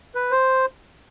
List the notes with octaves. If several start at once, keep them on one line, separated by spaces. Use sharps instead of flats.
B4
C5